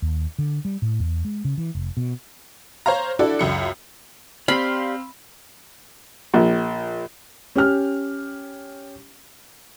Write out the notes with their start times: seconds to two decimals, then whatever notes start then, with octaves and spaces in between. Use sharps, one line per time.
0.02 D#2
0.38 D3
0.65 G3
0.82 A2
0.99 E2
1.25 G#3
1.45 C#3
1.58 E3
1.75 F1
1.97 B2
2.86 C5 C#5 F5 A#5
3.19 D4 E4 F#4 A4 D5
3.39 C#2 F#2 C#7
4.48 C4 G4 D5 F5 B5 C6
6.34 A#1
7.55 C#4 G4 F6